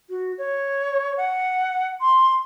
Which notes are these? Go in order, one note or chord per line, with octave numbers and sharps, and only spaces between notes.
F#4
C#5
F#5
C6